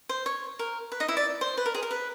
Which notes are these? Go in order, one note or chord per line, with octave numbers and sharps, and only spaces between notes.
C5
C#5
A#4
B4
D#4 D#5
E4 E5
D5
C5
B4
A#4
G#4
A#4
B4